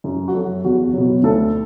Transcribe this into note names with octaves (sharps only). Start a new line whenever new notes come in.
F#2
F#4
F#3 A4
E2 F#4
B2 F#3
D2 A4